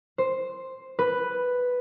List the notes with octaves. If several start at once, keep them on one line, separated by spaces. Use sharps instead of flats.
C5
B4